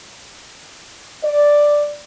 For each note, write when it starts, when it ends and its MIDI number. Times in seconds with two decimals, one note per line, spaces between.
1.24 1.97 74